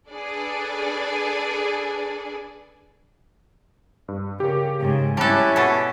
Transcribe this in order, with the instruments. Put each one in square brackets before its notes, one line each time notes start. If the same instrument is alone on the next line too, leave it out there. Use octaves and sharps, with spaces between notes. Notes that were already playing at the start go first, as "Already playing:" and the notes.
[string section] D4 G#4 A4 B4 D5
[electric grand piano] G2
[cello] C#3 [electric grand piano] G4 A#4
[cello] G#2 C#3
[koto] G3 A4 [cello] C#4 E4 [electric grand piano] A5 D6 F#6
[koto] B2 A4